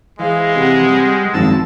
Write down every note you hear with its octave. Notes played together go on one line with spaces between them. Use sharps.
E3 G#3 G#4 C5 F5
C3 B4 F#5
G3
G#1 F#2 F3 A5 E6